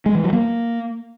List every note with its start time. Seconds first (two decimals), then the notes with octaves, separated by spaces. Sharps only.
0.06 G#3
0.15 E3
0.24 F#3
0.33 A#3